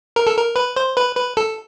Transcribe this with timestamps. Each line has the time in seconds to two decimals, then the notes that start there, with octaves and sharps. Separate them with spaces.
0.16 A#4
0.27 A4
0.37 A#4
0.56 B4
0.76 C5
0.97 B4
1.16 B4
1.37 A4